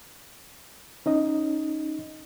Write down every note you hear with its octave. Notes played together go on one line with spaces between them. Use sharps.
C#4 D#4 D#5